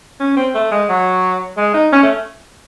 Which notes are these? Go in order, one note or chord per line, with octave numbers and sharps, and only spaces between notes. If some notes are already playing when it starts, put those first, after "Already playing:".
C#4
C4
A3
G#3
F#3
G#3
D#4
C#4
A3